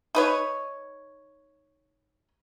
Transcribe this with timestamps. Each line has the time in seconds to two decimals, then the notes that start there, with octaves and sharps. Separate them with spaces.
0.15 D#4 B4 C#5